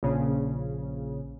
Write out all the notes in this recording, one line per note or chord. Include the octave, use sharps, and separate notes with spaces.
A#1 C#3